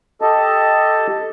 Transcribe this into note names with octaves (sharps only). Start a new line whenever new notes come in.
G4 A4 D#5 A5